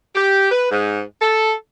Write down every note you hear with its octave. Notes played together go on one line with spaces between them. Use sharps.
G4
B4
G#2
A4